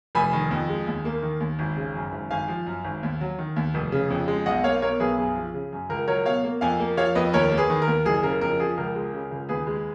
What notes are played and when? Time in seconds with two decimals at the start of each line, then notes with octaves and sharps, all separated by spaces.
0.15 F1 G#5 B5
0.33 D#3
0.51 F2
0.69 G#3
0.87 D#2
1.05 A#3
1.22 D#3
1.40 D#2
1.59 G#1
1.77 C#3
1.95 F#2
2.12 G#1
2.31 G#1 F5 G#5
2.48 F3
2.67 F#2
2.84 G#1
3.03 D#2
3.21 F#3
3.39 D#3
3.56 D#2
3.74 F1
3.92 C#3
4.10 F2
4.28 G#3
4.46 B1 D#5 F#5
4.64 A#3 C#5 F5
4.82 B2 A#4 C#5
5.00 B1 G#4 B4
5.18 F#2 G#4
5.36 F3
5.54 C#3
5.73 F#2
5.89 C#2 A#4
6.08 F#3 A#4 C#5
6.25 B2 C#5 F5
6.44 A#3
6.61 F2 F5 G#5
6.80 A#3
6.97 F3 C#5 F5
7.15 F2 B4 D#5
7.33 D#2 A#4 C#5
7.52 A#3
7.58 G#4 B4
7.70 D#3
7.82 A#4
7.87 D#2
8.05 F#1 G#4
8.23 C#3 A#4
8.41 F2 A#4
8.60 F3 G#4
8.77 C#2 A#4
8.95 G#3
9.13 C#3
9.31 C#2
9.49 D#2 G#4 B4
9.67 G#3